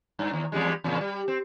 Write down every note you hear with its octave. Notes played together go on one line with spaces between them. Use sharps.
G2
D#2
E2 G3 G#3
E2 A#2 C#3
G3
C4